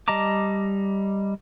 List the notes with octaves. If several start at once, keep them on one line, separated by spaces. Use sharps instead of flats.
G3 D#5 A5 A#5 D6